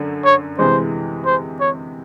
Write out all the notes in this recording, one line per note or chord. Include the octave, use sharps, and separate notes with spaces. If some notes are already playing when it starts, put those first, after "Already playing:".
Already playing: F#2 D3
C#5
C3 E3 G#3 C5
C5
C#5